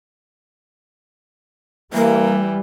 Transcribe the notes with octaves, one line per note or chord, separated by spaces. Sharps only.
E3 G3 A#3